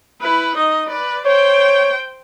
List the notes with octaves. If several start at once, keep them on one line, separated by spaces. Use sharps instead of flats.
E4 B4
D#4 D#5
B4 D5
C5 C#5 G5